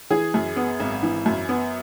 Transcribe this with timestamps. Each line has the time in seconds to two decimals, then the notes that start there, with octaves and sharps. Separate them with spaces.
0.10 E3 G#4
0.34 F#2
0.56 B3
0.80 G#1
1.03 E3
1.26 F#2
1.49 B3